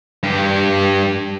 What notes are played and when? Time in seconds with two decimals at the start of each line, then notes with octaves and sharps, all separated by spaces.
0.23 G2 G4